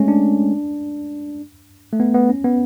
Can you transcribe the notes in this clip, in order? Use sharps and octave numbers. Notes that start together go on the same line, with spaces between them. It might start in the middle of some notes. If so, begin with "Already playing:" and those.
Already playing: G#3 A3 C#4
D4
A3
B3
B3
C#4
B3